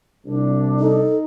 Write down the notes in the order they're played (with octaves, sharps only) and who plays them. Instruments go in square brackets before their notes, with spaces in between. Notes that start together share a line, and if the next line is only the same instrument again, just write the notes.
[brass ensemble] C2 [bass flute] D4
[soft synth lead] D#4 [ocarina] A4